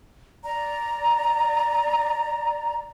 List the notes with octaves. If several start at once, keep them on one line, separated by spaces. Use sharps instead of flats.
D5 A#5